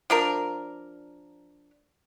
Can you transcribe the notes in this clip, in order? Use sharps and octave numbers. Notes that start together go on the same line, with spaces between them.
F3 D4 A#4